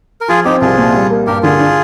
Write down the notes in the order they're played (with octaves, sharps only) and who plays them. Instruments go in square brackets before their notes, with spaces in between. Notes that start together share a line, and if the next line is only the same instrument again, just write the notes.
[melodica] A#4
[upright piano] F3 [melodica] F4 G#4
[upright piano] C4 [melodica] D#4 G4
[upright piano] C2 [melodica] F4 G#4
[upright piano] A#2
G3
A#3
[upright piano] G2 [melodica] G4 A#4
[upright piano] D3 [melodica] F4 G#4
[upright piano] D4